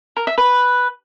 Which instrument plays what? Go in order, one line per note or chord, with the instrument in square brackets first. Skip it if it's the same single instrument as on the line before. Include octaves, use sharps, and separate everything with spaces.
[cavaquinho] A#4
E5
B4